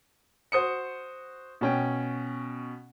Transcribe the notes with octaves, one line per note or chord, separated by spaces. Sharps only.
F#4 C5 D#6 C#7
B2 C#4 G5